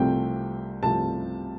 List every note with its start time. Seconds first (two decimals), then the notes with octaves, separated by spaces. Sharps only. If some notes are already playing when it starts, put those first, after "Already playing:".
Already playing: C2 C3 F3 A3 C4 G5
0.82 C2 C3 F3 A3 C4 A5